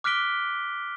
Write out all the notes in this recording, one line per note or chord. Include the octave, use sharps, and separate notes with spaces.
D6 F6 F#6 B6 D7 G7